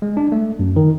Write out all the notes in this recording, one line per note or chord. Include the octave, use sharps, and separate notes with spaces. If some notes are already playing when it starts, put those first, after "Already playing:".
G#3
D4
A3
F#2
D#3